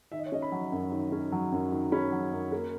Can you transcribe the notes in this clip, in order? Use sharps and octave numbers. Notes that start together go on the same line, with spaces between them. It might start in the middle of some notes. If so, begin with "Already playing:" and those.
D#3 E5
D#5
C#5
C#4 D#5
B5
F#3
F#2
D#3
C#4
F#3
F#2
D#3
C#4 B5
F#3
F#2
A#3